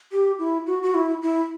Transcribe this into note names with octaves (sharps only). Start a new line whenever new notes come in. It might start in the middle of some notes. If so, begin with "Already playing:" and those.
G4
E4
F#4
F#4
E4
E4